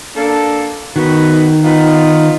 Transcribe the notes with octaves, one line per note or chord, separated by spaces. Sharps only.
A#3 D4 A4
D#3 B3 F#4
B3 D#4 F4